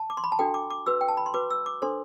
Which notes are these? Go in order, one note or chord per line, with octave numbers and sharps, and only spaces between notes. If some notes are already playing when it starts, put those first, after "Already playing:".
Already playing: A5
D6
C6
B5
A5
D4 F#4 A4 G5
D6
D6
F#4 B4 E6
G5
A5
B5
C6
F#4 B4 D6
E6
D6
D4 A4 C5 C6